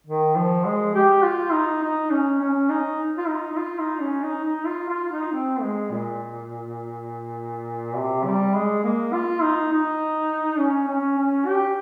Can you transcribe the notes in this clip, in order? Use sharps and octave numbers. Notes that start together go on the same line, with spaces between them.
D#3
F3
G#3
G4
F4
D#4
D#4
C#4
C#4
D#4
F4
D#4
D#4
F4
D#4
C#4
D#4
D#4
F4
F4
D#4
C4
G#3
A#2
C3
G3
G#3
A#3
F4
D#4
D#4
C#4
C#4
C#4
G4